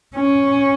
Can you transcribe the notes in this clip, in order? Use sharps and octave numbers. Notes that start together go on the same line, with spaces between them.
C#4